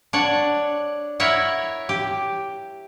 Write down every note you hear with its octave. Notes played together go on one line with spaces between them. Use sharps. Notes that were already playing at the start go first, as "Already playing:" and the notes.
D4 C#5 F#5
E4 A#4 C#5 E5 F#5
G4